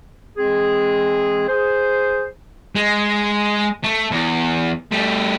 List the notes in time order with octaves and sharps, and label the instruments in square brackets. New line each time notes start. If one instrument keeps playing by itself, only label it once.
[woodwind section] E3 G#3 C4 G#4
G#4 C5
[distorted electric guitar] G#3
A3
E2
G3 A3